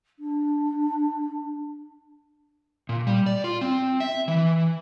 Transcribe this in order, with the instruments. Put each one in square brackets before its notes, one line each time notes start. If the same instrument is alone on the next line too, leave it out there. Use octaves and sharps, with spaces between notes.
[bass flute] D4
[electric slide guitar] A#2
G3
D5
F4
C4
E5
E3